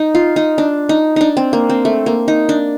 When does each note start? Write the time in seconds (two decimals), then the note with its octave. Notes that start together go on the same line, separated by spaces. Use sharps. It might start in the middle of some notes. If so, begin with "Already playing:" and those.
Already playing: D#4
0.15 F4
0.36 D#4
0.58 D4
0.89 D#4
1.16 D4 D#4
1.37 C4
1.53 A#3
1.70 C4
1.85 A3
2.06 A#3
2.28 D#4
2.49 D4